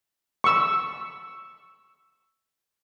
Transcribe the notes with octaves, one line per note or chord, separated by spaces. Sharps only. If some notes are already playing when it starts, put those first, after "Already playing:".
C#6 E6